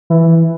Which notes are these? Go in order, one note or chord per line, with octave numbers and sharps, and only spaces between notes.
E3